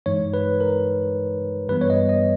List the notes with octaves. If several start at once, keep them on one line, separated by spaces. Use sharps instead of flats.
G2 E3 G#3 D#4 C#5
B4
A#4
G2 E3 G3 B3 B4
C#5
D#5
D#5